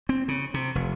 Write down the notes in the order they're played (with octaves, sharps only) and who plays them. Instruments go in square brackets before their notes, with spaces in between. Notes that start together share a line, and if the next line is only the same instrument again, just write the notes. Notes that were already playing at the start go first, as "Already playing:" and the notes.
[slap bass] C4
C#3
C3
F1